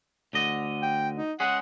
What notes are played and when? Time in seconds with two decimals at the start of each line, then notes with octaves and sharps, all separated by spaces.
0.33 D2 D3 D#5
0.82 G5
1.16 D#4
1.40 G#3 C#4 G#4 F#5